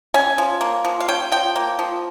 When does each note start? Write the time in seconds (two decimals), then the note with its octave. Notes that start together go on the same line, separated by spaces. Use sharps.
0.14 C#4 G#5
0.38 F3
0.61 A#3
0.85 F3
1.00 F5
1.08 C#4 G5
1.32 F3 G5
1.56 A#3
1.79 F3